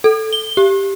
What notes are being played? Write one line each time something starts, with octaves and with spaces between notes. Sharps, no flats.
A4
G7
G4